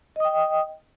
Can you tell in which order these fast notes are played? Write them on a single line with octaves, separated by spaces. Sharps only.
D#5 D#6 G5